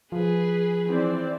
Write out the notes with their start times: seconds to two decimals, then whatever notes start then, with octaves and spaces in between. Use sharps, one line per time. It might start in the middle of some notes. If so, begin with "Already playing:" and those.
0.12 F3 G#4 B4
0.86 E3 C4 D5